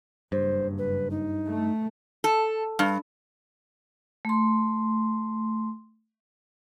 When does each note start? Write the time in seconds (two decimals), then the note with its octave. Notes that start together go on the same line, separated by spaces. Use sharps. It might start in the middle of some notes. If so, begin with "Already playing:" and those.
0.32 F#1 G2 C5
0.78 B4
1.10 D#4
1.46 A3
2.24 A4
2.79 G2
4.25 A3 C6